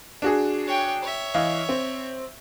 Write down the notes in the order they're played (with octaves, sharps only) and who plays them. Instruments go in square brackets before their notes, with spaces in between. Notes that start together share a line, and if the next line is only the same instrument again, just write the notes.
[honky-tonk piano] D4 F#4 G#4
[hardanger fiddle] C#5 G5
C#5 E5
[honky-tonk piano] E3 D#5 F5
C4